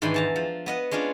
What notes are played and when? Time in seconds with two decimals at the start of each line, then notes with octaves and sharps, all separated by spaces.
0.02 G#2 D#3 E3 D4 B5 C6
0.14 E2 A5 A#5
0.36 F3
0.66 B3 D#5 F#5
0.91 G#3 C#4 D4 F4 C#5